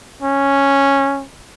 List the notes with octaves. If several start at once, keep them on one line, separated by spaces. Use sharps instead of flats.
C#4